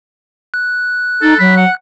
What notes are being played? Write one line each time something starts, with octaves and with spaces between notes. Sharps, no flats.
F#6
D#4 A4
F#3 B5
F#5